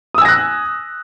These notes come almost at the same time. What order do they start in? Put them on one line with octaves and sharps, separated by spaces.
D#6 E6 G#5 A#6 F#6